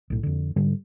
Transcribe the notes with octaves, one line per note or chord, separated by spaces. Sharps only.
B1 A2
F2 D3
G#2 D3 G3